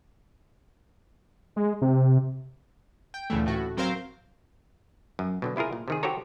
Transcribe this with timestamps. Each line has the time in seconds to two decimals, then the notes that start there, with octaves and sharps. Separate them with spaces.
1.56 G#3
1.81 C3
3.14 G5
3.30 D2 A#2 C#3 E3 A3
3.46 A2 A3 F#4
3.77 F#3 C4 A#4 C5 F5
5.19 F#2
5.42 B2 D3 F#3
5.56 C3 E4 F4 G#4 A#4
5.73 A#2
5.88 C3 D#3 G#4
6.03 F#4 G4 A4 C5 C#5 A#5